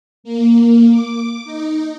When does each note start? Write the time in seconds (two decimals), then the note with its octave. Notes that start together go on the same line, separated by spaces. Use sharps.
0.24 A#3
0.90 D6
1.45 D#4